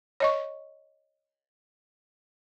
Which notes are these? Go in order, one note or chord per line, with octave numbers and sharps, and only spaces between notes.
C#5 D#5 C#6